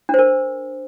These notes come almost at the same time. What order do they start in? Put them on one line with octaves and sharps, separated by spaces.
D4 C5 A#4